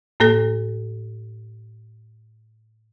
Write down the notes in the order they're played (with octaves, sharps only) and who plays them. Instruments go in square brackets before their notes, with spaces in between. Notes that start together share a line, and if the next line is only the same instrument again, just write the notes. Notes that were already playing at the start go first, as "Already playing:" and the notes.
[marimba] A2 A#3 A4 A#6